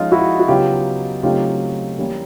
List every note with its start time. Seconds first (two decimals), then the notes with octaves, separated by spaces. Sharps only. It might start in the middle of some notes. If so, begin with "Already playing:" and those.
Already playing: F3 G#3 C#4 D#4 F4
0.12 E4 F#4
0.40 F#4
0.48 C#3 F#3 B3 D#4 F4 G4
1.23 C#3 F#3 A3 C4 D#4 F4 G4
1.98 E3 G3 A#3 C#4